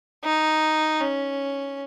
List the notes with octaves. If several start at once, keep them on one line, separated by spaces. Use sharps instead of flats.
D#4
C#4